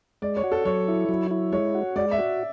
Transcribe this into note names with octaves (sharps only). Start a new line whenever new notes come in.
G#3 D5
C#5
F#4
A4
F#3 C#5
E4
F#3
E4
G#3 C#5
F#4
G#3 D5
E5
F#4